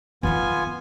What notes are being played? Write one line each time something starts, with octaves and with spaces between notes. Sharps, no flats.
F2 D#3 B3 F4 G#5